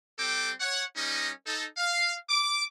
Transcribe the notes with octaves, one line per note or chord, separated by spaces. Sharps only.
G3 C4 A4 G5 D6
C#5 F#5
G3 C#4 D#4 A#4 D#5
D#4 A4
F5
D6